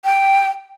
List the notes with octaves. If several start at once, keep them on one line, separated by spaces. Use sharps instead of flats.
G5